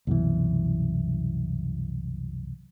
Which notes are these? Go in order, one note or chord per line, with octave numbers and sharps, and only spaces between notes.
C2 F#2 B2 E3